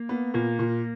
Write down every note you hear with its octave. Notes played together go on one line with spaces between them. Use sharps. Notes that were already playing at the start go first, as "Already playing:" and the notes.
Already playing: A#3
B3
A#2 A#3
A#2